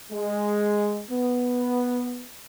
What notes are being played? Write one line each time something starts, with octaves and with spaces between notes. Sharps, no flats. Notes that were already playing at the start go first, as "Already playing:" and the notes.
G#3
B3